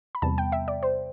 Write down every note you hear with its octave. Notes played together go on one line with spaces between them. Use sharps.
B5
E2 C3 G3 B3 A5
G5
E5
D5
C5